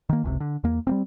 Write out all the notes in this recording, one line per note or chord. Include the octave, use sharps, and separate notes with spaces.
D#3 A#3
F#1 C#2 C3
D3
E2 A#3
G3 A#3 C4